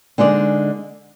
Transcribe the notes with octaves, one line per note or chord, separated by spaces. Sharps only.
D3 G#3 D#4 G#4 D5